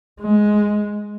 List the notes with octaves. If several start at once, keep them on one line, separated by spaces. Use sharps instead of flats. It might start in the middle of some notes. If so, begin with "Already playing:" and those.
G#3